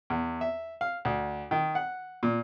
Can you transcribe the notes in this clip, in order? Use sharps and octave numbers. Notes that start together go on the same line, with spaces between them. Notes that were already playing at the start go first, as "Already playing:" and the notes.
E2
E5
F5
D2
D#3
F#5
A#2